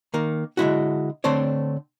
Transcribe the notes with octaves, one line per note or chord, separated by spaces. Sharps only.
D#3 A#3
D3 G#3 E4 F#4
D3 A3 C4 D4 C5 C#5